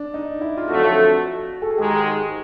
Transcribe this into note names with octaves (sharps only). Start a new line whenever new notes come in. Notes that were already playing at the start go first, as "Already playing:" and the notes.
Already playing: D4
D#4
E4
F4
F2 D3 F#3 A3 F#4
A4
G#4
G#2 D#3 G#3 G4